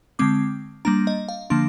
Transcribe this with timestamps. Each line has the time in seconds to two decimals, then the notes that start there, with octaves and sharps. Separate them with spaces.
0.19 D3 G#3 C4 D6
0.85 G3 A#3 D4 A#5
1.07 D#5
1.29 F5
1.50 D3 F3 A#3 D4 C6